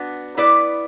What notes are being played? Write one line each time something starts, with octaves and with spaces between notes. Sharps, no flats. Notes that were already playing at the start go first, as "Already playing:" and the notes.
Already playing: B3 D4 F#4
B3 E4 B4 D5